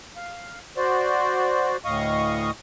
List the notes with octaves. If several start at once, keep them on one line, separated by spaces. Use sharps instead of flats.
F5
F#4 C5 D5
D2 A2 D#5 F5 C#6 D#6